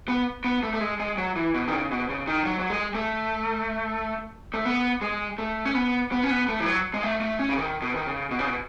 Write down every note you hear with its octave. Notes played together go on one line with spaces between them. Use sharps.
B3
B3
A3
A3
G#3
G#3
F#3
E3
B2
D#3
C#3
B2
C#3
D#3
F#3
F#3
G#3
A3
A3
B3
G#3
A3
C#4
B3
B3
C#4
B3
A3
E3
F#3
G#3
A3
A3
C#4
C#3
D#3
B2
D#3
C#3
B2
C#3
B2